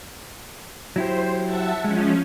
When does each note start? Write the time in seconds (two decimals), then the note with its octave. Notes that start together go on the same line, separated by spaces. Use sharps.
0.96 F#3 E4 G4 C5
1.44 E5 F#5 A5
1.84 F3 G#3 C#4